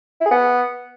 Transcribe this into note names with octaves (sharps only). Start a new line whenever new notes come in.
E4
G#4
B3